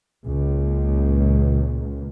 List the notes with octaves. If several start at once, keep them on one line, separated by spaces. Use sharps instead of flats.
C#2 A#2